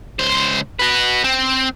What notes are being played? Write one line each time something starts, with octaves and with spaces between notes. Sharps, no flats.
C#2 C5
F#4 B4
C4